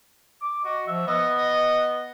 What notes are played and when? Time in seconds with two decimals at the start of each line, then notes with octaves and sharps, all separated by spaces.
0.42 D6
0.65 F#4 D#5
0.88 F3 E5
1.07 B3 D#5
1.37 D#5